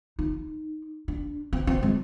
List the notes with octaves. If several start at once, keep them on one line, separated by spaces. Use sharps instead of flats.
D#4
D4
C4
C4
G#3